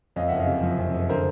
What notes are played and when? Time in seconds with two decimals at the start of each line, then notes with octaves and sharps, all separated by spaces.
0.16 F2 D#5 F5
0.28 F#1 E5 F#5
0.39 D#5 F5
0.47 C3
0.62 F3
0.78 F2
0.93 F#1
1.09 D3 A#4 C5